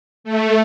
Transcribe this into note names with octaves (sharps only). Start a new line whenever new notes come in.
A3